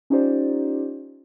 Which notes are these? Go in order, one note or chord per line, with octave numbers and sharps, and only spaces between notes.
C#4 D#4 F4 G4 C5 D5